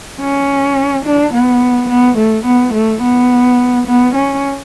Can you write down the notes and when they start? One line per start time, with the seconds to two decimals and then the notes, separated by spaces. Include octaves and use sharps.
0.20 C#4
1.05 D4
1.33 B3
1.89 B3
2.17 A3
2.45 B3
2.73 A3
3.02 B3
3.87 B3
4.15 C#4